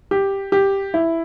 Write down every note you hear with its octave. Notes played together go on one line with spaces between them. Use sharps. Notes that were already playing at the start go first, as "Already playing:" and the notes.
G4
G4
E4